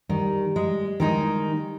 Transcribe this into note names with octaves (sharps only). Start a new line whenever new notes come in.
D#3 G3
G#3
D#3 G#3 D#4